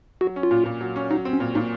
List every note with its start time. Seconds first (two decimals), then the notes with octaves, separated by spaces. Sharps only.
0.21 F#3 F#4
0.36 C#4
0.43 F4
0.51 A#2
0.66 A#2
0.81 F#3
0.96 C#4
1.10 F#3 D#4
1.25 C4
1.33 C#4
1.40 A#2
1.55 A#2 D#4